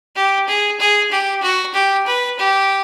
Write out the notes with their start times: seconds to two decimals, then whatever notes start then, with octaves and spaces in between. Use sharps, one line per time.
0.16 G4
0.48 G#4
0.80 G#4
1.11 G4
1.43 F#4
1.74 G4
2.07 B4
2.39 G4